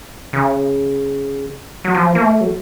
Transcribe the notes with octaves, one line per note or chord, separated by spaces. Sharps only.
C#3
F#3
F3
A#3
A3
F#3